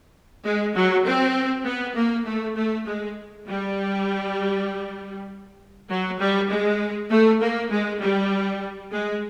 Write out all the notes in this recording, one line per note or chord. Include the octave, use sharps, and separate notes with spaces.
G#3
F#3
C4
B3
A#3
A3
A3
G#3
G3
F#3
G3
G#3
A3
A#3
G#3
G3
G#3